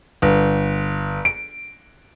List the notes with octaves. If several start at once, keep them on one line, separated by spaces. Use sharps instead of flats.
G1
D7